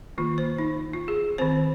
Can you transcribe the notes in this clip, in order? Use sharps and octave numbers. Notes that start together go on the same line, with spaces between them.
D#3 A#3 F4
C5
D#4
F4
G#4
D#3 C4 C5